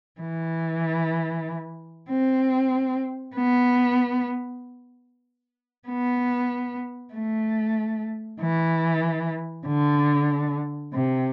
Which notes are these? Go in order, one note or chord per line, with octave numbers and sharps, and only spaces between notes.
E3
C4
B3
B3
A3
E3
D3
C3